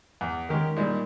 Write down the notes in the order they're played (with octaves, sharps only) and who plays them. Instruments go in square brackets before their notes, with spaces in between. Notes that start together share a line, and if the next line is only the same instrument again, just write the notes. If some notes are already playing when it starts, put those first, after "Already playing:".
[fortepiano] E2
[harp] D#3 C#4 [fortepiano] G#3 G4 A#4
[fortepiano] A#2 G3 G#3